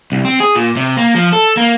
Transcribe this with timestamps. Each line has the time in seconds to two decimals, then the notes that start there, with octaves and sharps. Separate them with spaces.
0.12 C2
0.25 C4
0.40 G#4
0.56 A#2
0.77 C3
0.97 A#3
1.15 F3
1.33 A4
1.57 A#3